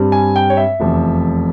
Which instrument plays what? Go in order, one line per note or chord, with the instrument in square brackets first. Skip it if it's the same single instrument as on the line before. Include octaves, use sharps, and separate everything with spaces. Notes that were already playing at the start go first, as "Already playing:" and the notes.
Already playing: [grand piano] G2 G3 C4
G#5
G5
C#5
E5
F1 E2 C3 F3